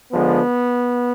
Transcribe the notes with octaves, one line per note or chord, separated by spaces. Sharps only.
D3 F3 G#3 B3